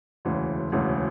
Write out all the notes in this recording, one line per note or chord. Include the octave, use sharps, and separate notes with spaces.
E1 D2 C#3 E3
E1 D2 C#3 E3